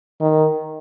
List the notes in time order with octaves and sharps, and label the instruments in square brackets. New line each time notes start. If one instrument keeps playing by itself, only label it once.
[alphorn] D#3